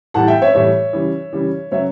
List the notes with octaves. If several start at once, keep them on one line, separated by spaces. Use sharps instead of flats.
A2 E3 G3 F#5 A5
E5 G5
C#5 E5
A2 E3 G3 C#5 E5
C#3 E3 G3
C#3 E3 G3
C#3 F#3 C#5 E5